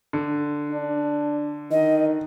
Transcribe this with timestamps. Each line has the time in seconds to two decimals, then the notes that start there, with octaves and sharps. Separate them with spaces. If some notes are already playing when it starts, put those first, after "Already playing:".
0.13 D3
0.71 D4
1.71 D#3 D#5